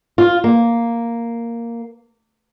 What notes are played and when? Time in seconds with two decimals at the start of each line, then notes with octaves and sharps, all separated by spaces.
0.18 F4
0.44 A#3